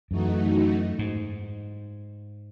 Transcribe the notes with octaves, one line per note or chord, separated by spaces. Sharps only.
F#2 E3 A3 D#4 F#4
G#2